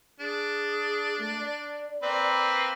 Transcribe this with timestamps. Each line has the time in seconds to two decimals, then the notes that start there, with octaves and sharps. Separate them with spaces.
0.20 D4 G#4
1.19 A3
1.39 D5
2.03 A#3 C4 B4